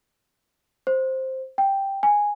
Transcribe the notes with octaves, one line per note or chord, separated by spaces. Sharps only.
C5
G5
G#5